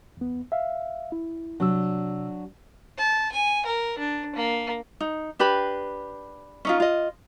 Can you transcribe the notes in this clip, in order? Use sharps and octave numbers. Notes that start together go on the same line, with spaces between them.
E2 B3
E5 F5
E4
C2 C3 F#3 D4 E6
A5
G#5
A#4
D4
A#3
D#4
D4 G4 B4 B5
C#4 D#4 F4
F4 D#5